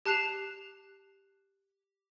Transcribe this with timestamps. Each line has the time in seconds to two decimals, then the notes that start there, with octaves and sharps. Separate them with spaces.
0.06 G4 A5 F#6 C7 E7 F7